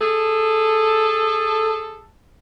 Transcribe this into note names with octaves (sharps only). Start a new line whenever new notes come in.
G#4 A4